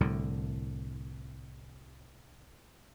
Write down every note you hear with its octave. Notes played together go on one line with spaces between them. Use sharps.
C2 A2 D3